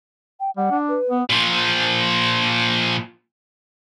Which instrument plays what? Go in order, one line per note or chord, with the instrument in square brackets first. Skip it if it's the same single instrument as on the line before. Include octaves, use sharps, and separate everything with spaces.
[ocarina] G5
[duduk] G3 [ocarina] F#5
[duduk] D4
[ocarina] B4
[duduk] B3
[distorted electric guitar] A#2 F3